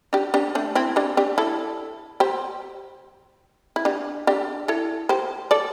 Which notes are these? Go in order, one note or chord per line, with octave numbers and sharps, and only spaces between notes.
D4 G4
D4 G4
A3 D4
C4 E4
D4 G4
D4 G4
E4 A4
G4 C5
E4
D4 G4
D4 G4
E4 A4
G4 C5
A4 D5